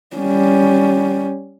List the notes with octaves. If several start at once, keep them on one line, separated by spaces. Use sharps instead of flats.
G3 C#4